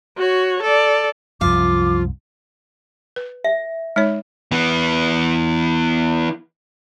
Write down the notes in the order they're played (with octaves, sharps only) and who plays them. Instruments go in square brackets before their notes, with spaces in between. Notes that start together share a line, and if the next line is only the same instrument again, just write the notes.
[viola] F#4 C#5
A4 D5
[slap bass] C2 F#2 [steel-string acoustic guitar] F3 F5 [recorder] F4 [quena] D6
[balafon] B4
[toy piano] E5
[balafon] G#3 D#4 C#5
[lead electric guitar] E3 B3